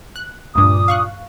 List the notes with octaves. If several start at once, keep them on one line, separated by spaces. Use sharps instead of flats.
F#6
D2 G2 A#2 D6 D#6
F5 C#6 F#6